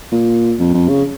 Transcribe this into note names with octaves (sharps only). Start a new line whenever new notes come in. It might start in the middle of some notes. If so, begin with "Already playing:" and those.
A#2
F2
F2
C#3